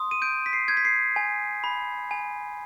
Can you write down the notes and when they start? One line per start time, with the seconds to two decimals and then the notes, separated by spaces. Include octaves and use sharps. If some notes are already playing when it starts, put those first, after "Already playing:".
Already playing: C6 D#6
0.11 D#7
0.22 G6 D7
0.46 B6
0.53 C7
0.68 G6 G#6
0.77 B6
0.85 C7
1.16 G#5
1.64 B5
2.11 G#5